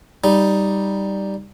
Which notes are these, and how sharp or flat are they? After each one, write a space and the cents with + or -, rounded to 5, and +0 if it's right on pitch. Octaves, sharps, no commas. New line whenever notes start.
G3 +0 D#4 +0